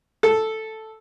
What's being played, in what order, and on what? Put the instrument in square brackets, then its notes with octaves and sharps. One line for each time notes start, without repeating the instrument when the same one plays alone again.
[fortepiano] A4